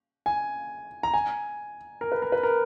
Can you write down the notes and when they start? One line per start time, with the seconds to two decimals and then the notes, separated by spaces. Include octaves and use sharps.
0.26 G#5
1.03 A#5
1.14 G#5
2.01 A#4
2.12 B4
2.22 A#4
2.32 B4
2.43 A#4